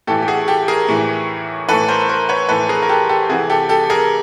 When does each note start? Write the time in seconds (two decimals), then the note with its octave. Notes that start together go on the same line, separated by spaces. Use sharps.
0.07 A2 E3 G4 A4
0.22 G4
0.28 F#4 G#4
0.48 G4 A4
0.68 G#4 A#4
0.88 A2 E3
1.69 A2 E3 A4 B4
1.88 A#4 C5
2.09 A#4 C5
2.29 B4 C#5
2.49 A2 E3 A4 B4
2.69 G#4 A#4
2.82 A#4
2.89 G4 A4
3.09 G4 A4
3.29 C3 E3 F#4 G#4
3.50 G4 A4
3.69 G4 A4
3.90 G#4 A#4